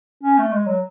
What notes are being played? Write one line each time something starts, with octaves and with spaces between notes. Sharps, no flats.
C#4
A3
G#3
F#3